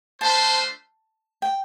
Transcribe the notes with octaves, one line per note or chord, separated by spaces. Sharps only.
A3 D4 F4 C5 A5
G5